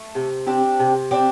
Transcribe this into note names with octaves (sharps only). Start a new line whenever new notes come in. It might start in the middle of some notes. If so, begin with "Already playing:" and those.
Already playing: A3
C3
C4 D4 G4
C3
C4 D4 G4